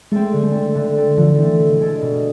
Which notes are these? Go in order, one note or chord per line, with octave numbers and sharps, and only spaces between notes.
G#3 A3 C4
D3
A3 C4
D3
A3 C4
D3 F3
E3 A3 C4
B2
G#3 D4 A4
B2